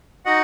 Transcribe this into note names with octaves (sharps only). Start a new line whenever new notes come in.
D#4 F#4 D#5 F#5